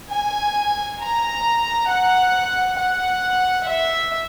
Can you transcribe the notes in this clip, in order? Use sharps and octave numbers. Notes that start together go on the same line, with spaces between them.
G#5
A#5
F#5
F#5
E5